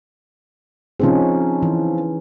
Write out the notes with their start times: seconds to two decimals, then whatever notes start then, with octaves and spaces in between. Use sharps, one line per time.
1.00 F3 C4 C#4 D#4 G#4
1.63 E3